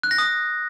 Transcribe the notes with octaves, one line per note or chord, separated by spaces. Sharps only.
F#6
A#6
D#6